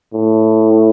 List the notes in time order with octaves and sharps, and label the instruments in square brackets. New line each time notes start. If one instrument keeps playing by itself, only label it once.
[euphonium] A2